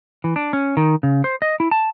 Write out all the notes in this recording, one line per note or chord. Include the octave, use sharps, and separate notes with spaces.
E3
D4
C#4
D#3
C#3
C5
D#5
E4
A5